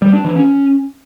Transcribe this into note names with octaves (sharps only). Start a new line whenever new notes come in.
G3
D4
E3
C#4